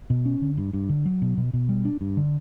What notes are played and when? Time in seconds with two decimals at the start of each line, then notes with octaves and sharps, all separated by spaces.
0.10 B2
0.26 C#4
0.42 D3
0.58 G2
0.73 G2
0.89 D3
1.06 F#3
1.22 B2
1.37 B2
1.53 B2
1.69 G3
1.85 D4
2.01 G2
2.17 D3